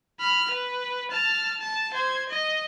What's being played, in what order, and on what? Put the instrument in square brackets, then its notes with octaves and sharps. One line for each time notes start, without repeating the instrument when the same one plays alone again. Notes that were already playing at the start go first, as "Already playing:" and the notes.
[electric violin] B5 F6
B4
A5 F6
A5
C5 G#6
D#5